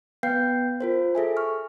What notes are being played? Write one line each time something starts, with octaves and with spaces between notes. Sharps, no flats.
B3 B4 F5 G5 G6 C7
F4 A#4 C5
G#4 A4 E5 G#5
C#6 F6